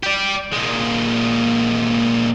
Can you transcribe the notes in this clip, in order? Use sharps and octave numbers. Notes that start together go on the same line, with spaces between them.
G4 D5
A#2 G#3